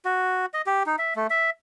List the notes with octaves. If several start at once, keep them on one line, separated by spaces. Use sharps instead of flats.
F#4
D#5
G4
D#4
E5
A3
E5